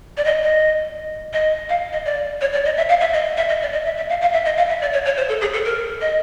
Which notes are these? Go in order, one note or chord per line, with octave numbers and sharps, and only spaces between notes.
D5
D#5
D#5
D#5
F5
D#5
D5
C#5
D5
D#5
E5
F5
E5
D#5
E5
D#5
D5
D#5
E5
E5
F5
F5
E5
D#5
F5
E5
D5
C#5
C#5
C5
A4
G#4
A4
A#4
D#5